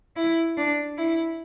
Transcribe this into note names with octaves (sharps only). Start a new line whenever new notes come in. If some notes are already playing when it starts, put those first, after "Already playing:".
E4
D4
E4